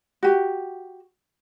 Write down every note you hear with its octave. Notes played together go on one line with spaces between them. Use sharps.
F#4 G4